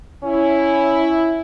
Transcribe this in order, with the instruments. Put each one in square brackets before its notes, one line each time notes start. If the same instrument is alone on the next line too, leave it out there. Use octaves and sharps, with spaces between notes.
[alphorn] C#4 [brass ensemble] E4